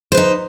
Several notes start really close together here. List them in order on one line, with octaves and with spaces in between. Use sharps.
C5 B4 D#4